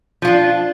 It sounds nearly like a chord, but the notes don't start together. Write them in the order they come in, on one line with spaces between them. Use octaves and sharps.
F3 F4 D4